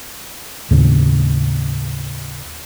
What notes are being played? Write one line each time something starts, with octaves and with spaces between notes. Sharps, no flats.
D#2 A2 C#3